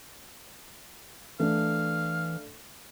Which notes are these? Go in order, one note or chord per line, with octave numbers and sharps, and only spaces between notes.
E3 A3 D4 F5